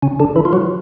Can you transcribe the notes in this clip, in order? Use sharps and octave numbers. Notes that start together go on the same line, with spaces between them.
C#3 C#4
D3 D4
E3 E4
F4
F#3 F#4